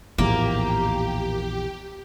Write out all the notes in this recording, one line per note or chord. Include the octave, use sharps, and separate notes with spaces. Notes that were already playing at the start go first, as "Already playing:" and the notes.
A#1 E2 A2 A#3 B3 G4